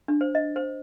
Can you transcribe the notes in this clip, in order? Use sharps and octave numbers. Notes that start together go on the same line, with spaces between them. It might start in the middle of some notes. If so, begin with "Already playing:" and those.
D4
C5
D#5
C5